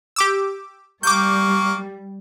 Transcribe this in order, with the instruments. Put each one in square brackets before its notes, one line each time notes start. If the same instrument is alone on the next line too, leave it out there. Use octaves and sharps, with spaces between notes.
[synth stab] G4 D6 E6
[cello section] G3 [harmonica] A#3 C#6 [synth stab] D6 G6